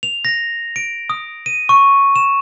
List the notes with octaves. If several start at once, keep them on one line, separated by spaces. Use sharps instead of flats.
F7
A#6
D7
D#6
D#7
C#6
E7